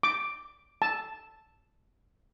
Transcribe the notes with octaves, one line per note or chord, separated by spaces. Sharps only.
D6
A5